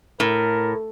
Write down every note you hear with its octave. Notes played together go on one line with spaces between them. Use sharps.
A2 A#4